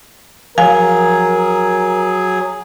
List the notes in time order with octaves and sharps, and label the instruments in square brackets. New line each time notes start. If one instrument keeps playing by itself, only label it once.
[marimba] F3 F5 G#5 [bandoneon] F#3 G#4 [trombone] A#4